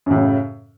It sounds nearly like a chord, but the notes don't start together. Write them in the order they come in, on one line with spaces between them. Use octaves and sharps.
F#2 A2 C#3